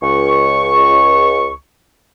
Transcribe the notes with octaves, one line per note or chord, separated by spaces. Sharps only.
C#2 C#6